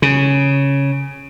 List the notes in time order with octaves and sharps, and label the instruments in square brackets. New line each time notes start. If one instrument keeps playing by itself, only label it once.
[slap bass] C#3